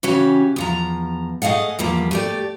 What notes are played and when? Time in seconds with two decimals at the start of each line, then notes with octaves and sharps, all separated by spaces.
0.03 C#3 E3 C#4 F#4 G4
0.56 E2 F3 A#5
1.42 A3 G#4 D#5 F5 F#5
1.79 E2 F3 G3 A#3
2.11 A3 G4 D5